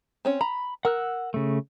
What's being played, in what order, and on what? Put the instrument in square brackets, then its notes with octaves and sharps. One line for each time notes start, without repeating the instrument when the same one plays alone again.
[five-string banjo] C4 C#4 C#5
[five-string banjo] A#5 [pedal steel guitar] B5
[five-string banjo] A#4 [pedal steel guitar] F#5 E6 F#6
[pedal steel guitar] C#3 A3